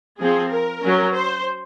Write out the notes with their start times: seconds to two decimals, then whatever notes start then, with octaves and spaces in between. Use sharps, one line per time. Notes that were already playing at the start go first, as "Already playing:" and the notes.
0.19 F3 C4 G#4
0.51 A#4
0.82 F#3 C#4
1.14 C5